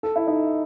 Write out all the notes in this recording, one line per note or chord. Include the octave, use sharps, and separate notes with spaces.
A4
E4
D#4